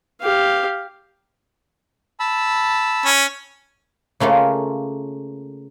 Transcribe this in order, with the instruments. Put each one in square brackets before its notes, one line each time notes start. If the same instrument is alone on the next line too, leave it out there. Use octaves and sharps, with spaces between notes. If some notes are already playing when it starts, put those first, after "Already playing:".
[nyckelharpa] G4 F5
[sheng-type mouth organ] A5 B5 E6
[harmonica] C#4
[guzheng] C#3 A3 A#3 F4